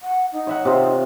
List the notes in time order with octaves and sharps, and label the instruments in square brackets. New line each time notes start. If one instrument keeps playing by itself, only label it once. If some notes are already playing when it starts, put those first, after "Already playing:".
[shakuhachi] F#5
D#4
[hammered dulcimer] C#5 E5 F#5
C3 F4